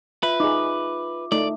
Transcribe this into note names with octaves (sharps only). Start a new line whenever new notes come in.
F4 B4 E5
D#4 G#4 D6
A3 D#4 D5